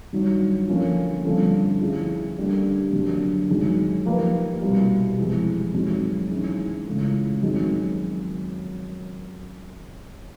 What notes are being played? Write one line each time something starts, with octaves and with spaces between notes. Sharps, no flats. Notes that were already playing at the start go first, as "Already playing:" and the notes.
G2 D#3 F#3
D3 F3 A#3 C#4 F4
G2 D3 F3 A3 C4
F3 A3 C#4 E4 G#4
D3 G3 A#3 D4
F#2 D3 F#3 A#3 D4
F#2 D#3 G#3
F3 A#3 D#4 G4 B4
C2 B2 G3
F2 C3 E3 G#3
F#2 D#3 G#3 C4
G#2 E3 G#3 C#4 E4
C#2 C#3 E3 A3
F#2 D#3 G#3 C4